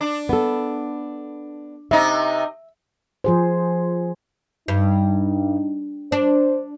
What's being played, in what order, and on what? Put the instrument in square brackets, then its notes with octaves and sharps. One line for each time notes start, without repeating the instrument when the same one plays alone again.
[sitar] D4
[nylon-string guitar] B3 A4
[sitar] C3 D#4 [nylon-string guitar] E5
[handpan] F3 G#4 C5
[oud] G2 [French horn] D#4
[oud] D4 [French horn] C5